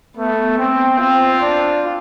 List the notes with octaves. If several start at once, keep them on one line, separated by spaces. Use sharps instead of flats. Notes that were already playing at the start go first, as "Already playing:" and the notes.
A3 B3
B3 C4
C4 F4
D4